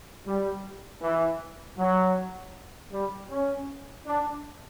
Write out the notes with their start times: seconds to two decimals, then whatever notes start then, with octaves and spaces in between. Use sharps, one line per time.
0.26 G3
1.02 E3
1.78 F#3
2.93 G3
3.30 C#4
4.06 D4